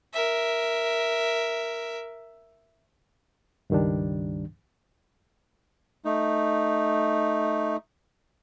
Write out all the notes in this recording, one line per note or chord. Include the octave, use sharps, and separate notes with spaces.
A#4 E5
C#2 G2 D#3 G3 D4
A3 D#4